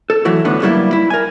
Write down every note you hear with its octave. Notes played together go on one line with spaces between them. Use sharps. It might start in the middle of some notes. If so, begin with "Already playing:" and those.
A4
E3 F#3 A3 E4 F#4
D2 A2 B3 D4 F#5
G2 F#3 G3 A#3 E4
E4
A#4 G#5